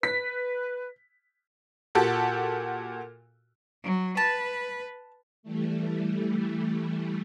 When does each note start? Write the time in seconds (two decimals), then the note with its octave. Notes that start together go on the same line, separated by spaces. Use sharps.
0.03 B4 B6
1.95 A#2 F#4 G4 A4
3.84 F#3
4.17 B4 A5
5.43 E3 G3 A3